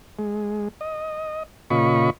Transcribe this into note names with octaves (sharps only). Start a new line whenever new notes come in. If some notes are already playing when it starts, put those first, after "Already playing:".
G#3
D#5
A#2 C#3 F4 D#5 B5 C#6